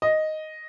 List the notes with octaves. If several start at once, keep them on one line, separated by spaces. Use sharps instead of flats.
D#5